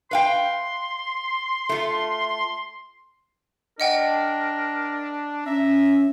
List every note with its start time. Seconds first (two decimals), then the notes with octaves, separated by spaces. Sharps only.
0.11 B4 F5 G5 C6
1.69 A3 F4
3.80 D4 A#4 D#5 F#5 G5
5.46 C#4 E5 A#5